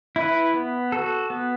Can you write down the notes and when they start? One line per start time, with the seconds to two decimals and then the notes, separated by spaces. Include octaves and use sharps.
0.16 E4 B4
0.54 B3
0.92 F#4 A4
1.30 B3